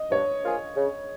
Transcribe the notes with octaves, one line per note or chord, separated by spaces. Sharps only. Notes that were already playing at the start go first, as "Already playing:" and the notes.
Already playing: D#5
G2 C#5
F3 A#3 F4 G#4
C#3